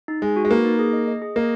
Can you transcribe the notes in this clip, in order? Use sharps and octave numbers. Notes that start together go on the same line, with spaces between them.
D#4
G#3 D#4
F#4
G#3
A#3 B4
D#4
G#4
D#5
D#5
G#4
A#3 D#5